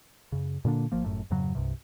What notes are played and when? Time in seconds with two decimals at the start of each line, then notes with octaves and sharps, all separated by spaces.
0.32 F#2 C#3
0.65 A#2 D3 A#3 D4
0.92 G#1 F3 A#3
1.04 G1 F#2 A2
1.30 F2 G#2 C#3 F#3
1.55 C2 G2 C3